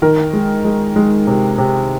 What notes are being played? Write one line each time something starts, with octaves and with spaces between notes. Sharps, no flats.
D#3 A#4
G#3
G#3
G#3
C3
C3